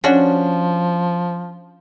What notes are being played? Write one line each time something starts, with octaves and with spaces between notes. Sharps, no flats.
F3 C#4 D4 F#4